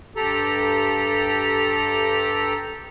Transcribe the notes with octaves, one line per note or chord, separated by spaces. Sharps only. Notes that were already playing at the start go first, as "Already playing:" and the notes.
G2 G4 A4 A#5